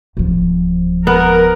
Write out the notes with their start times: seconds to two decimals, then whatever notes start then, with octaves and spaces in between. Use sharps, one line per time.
0.17 D1 F3
1.07 B3 A#4